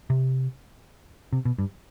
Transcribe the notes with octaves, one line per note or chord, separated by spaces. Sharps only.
C3
C3
B2
G2